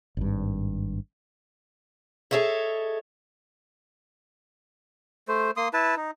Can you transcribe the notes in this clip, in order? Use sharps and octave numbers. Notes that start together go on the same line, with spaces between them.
G#1 G2
G#4 A4 C#5 D#5 E5
A3 C5
A#3 C6 D#6
E4 B4 A5
D#4